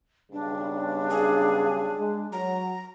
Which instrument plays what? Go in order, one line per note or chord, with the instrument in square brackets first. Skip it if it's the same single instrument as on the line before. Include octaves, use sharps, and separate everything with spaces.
[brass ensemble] B1 G2 C#3 [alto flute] D4
[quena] G#4
[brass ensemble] G#3
[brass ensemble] F#3 [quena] A#5